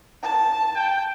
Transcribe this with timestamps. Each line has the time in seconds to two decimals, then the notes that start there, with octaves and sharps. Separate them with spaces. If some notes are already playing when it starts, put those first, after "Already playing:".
0.24 A5
0.75 G5